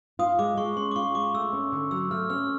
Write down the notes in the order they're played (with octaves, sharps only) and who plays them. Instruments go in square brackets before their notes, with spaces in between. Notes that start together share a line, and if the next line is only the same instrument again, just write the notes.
[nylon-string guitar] F4 [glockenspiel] D#6
[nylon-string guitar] G#3 [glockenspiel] D6
[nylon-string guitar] G#3 [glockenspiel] C#6
[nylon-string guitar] C#4 [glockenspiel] C6
[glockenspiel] D6
[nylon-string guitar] F4 [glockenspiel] C#6
[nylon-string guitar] G#3 [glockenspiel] D6
[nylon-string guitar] A3 [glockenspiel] E6
[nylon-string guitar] C#4
D3
[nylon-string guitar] F#3 [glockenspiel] E6
[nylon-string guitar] A3 [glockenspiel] F6
[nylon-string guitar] C#4 [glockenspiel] F6